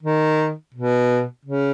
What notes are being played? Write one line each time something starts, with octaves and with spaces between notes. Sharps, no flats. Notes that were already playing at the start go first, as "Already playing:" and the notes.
D#3
B2
C#3